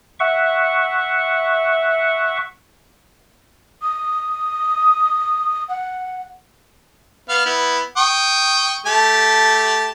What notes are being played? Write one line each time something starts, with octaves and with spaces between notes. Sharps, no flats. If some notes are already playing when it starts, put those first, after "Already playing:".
E5 F#5 C#6
D#6
F#5
B3 F5 F6
B3 E4
G5 C#6 D#6
A3 G4 A5